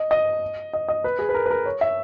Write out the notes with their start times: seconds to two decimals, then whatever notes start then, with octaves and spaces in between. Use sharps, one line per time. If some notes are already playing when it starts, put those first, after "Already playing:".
Already playing: D#5
0.11 D#5
0.73 D#5
0.88 D#5
1.04 B4
1.19 G#4
1.29 B4
1.35 A#4
1.46 B4
1.51 A#4
1.66 C#5
1.81 E5